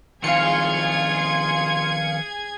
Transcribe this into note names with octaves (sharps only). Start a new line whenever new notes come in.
D#3 F3 C4 F4 G#4 F5 G#6 C#7